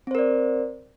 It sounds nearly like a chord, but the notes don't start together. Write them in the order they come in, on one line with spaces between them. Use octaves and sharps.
C4 C5 A#4 D5